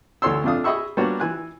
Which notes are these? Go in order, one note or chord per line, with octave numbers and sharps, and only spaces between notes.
D2 E3 A4 C#5 C6 E6
F2 A3 D4 F5 D#6
G#4 D#5 E5 B5 C#6 E6
G3 A#3 B3 D4 F#4 C#5
E3 G#5 F#6